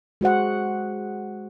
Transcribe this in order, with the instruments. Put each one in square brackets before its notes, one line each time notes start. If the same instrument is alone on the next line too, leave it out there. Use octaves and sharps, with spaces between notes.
[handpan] G#3 F#4 C5 F#5